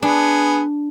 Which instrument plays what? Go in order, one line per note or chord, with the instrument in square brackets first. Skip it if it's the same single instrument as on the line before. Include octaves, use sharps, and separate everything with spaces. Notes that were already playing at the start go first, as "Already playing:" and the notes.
[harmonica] B3 G#4 [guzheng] D4